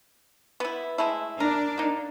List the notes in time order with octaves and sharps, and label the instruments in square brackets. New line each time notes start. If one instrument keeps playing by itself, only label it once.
[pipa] B3 E4
G#3 A3 E4
[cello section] D4 [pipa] A#4
[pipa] A#3 D#4